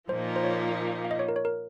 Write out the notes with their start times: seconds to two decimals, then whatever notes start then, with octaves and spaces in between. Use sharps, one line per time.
0.09 A#2 F3 A#3 D#4 C5
0.36 C5
0.44 C#5
1.05 F5
1.11 D#5
1.19 C#5
1.29 A#4
1.36 C#5
1.45 A#4